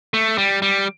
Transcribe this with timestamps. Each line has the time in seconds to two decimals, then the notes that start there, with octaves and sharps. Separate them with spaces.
0.14 A3
0.38 G3
0.62 G3